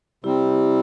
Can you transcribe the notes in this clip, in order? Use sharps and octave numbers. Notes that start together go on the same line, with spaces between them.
C3 G3 C4 E4 G4